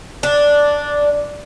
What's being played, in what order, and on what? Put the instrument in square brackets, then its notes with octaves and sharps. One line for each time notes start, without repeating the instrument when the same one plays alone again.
[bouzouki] D4